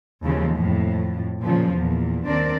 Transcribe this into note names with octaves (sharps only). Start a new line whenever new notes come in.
D#2 C#3 E3 F3 G#3
F2 A2
A#2 C#3 F3
E2 A#2
D#2 C4 D4 A#4 D5